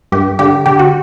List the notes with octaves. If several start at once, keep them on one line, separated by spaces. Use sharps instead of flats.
G2 G4
D3 G4
D3 G4
F#4